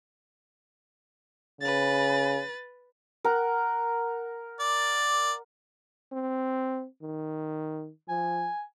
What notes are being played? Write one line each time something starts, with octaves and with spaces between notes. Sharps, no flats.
C#3 B4 A6
A#4 F#5
D5
C4
D#3
F3 G#5